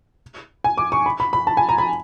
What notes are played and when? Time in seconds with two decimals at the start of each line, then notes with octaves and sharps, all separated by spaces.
0.64 G#5
0.78 D6
0.92 C#6
1.06 B5
1.20 B5
1.33 B5
1.47 A5
1.57 G#5
1.69 A#5
1.78 B5